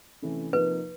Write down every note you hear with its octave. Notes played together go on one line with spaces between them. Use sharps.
C3 E3 A3 C#4 E4
C3 F3 A#3 D#4 B4